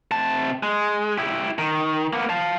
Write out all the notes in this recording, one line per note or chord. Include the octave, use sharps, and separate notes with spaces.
C3 A5
G#3
E4 G4
D#3
A#3 B3
F5 A5